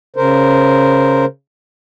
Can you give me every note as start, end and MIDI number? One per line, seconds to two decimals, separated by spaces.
0.16 1.25 49
0.16 1.25 70
0.16 1.25 72